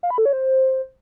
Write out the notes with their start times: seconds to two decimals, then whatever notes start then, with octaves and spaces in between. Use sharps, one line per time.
0.03 F5
0.11 B5
0.18 A4
0.25 C#5
0.33 C5